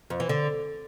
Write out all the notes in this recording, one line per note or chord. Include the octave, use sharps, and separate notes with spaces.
F2
E3
D3